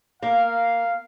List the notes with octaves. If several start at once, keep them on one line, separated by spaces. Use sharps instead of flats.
A#3 F5